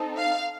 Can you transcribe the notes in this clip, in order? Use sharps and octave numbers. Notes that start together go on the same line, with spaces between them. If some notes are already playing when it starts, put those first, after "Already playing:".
Already playing: C4 D#4 A4
F5